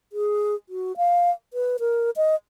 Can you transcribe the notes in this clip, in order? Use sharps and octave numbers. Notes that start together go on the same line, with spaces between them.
G#4
F#4
F5
B4
A#4
D#5